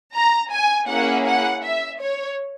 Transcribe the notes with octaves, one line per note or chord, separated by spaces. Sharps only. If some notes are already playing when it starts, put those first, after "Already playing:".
A#5
G#5
A#3 C#4 E4 G#4 F#5
F#5
E5
C#5